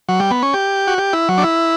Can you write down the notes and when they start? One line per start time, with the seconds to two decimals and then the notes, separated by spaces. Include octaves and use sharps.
0.09 F#3
0.20 G3
0.31 B3
0.43 C#4
0.54 G4
0.87 F#4
0.98 G4
1.13 E4
1.29 F#3
1.38 D4
1.44 E4